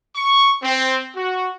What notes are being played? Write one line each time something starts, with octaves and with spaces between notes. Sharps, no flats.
C#6
C4
F#4